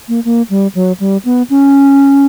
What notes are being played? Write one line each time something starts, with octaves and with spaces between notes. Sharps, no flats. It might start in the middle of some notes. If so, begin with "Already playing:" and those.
A#3
A#3
G3
F#3
G3
B3
C#4